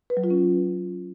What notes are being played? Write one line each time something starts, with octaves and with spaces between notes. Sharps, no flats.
B4
F#3
F4
C#4